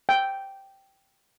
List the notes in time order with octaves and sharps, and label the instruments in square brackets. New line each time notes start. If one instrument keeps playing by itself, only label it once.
[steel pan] G5